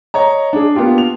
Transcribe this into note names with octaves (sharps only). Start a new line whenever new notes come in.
C#5 D#5 A#5
D4 G#4
A#3 B3 D4 F4 G4
F7